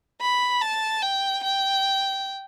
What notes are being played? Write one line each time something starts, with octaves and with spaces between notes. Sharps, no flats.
B5
A5
G5
G5